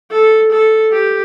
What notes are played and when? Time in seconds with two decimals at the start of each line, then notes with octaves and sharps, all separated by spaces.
0.12 A4
0.52 A4
0.93 G4